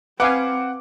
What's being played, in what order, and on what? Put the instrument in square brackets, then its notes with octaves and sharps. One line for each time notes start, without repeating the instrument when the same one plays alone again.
[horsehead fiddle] C4 [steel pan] B4 F5 G#5 [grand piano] F#5 D6